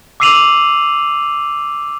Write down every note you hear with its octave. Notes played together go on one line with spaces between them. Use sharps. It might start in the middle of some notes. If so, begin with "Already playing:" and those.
D6 E6 C7 D#7 F7 F#7